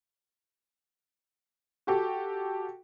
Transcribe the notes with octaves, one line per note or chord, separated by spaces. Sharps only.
F#4 G4 A4